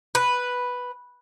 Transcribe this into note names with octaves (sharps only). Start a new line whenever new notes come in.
B4